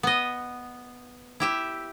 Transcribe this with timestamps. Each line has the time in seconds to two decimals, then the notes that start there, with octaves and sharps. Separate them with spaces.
0.03 B3 D#5
1.40 E4 G4 E5